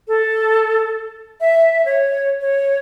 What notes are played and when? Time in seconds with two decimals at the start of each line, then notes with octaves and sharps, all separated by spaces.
0.08 A4
1.41 E5
1.85 C#5
2.41 C#5